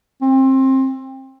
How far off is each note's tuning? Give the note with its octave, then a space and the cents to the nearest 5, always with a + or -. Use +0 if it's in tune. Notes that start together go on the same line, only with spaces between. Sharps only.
C4 +25